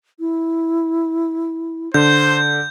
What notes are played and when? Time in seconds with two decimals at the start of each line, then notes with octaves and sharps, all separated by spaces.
0.20 E4
1.94 D3 C5 G6